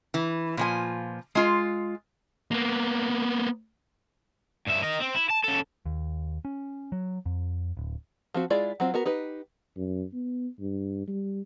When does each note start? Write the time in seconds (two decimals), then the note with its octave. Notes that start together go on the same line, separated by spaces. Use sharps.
0.14 E3
0.57 A#2 F3 G#5
1.35 G#3 F4
2.51 A#3 B3
4.67 G2 E5
4.84 A#4 D#5
5.02 C4
5.16 E4
5.30 A5
5.44 C#3 A4
5.86 D#2
6.45 C#4
6.92 F#3
7.26 F2
7.77 D1
8.34 F3 C4 F#4
8.50 G#3 E4 F4 D5
8.80 F#3 C4 F4
8.94 B3 F#4 A#4
9.05 D#4 G4 B4
9.77 F#2
10.13 B3
10.60 G2
11.08 G3